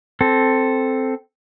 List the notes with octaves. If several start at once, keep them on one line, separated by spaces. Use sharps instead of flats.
C4 A4